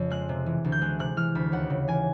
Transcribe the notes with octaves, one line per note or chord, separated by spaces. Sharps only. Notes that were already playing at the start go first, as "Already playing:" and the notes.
Already playing: F2 C#3
G#3 F#6
C3
E3
D2
G6
G#3 F#6
C3 F#6
E3 F6
D2 B5
D#2 F#5
C#3
E3 G#5